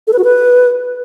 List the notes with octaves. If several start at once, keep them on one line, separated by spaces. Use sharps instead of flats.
A4
B4
F#4
B4